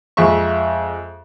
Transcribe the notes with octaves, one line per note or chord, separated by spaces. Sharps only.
F2 G#3 E5 C#6